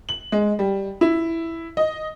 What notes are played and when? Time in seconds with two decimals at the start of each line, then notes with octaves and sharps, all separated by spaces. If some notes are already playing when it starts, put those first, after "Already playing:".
0.09 F#7
0.32 G#3
0.59 G3
1.01 E4
1.77 D#5